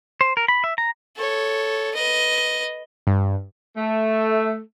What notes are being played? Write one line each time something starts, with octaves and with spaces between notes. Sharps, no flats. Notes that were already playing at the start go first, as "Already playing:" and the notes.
C5
A#4
B5
E5
A#5
A4 C#5
B4 D#5
G2
A3